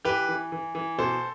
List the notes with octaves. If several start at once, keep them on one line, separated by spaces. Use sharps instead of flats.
E3 G4 B4
E3
E3
E3
B2 A4 C5